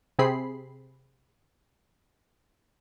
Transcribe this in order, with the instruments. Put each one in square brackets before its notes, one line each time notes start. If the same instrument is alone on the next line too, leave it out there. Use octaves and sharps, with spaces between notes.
[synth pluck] C3 C4 G#4 B5 C7